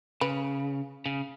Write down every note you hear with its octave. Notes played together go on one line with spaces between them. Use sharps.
C#3 B4
C#3